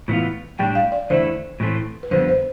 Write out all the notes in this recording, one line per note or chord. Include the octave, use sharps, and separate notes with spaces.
A2 E3 B3 F4
A2 G3 D4 G5
F5
D5
E2 D3 A3 E4 C5
A2 E3 A3 C4
B4
F2 D3 G3 B3 C5
C5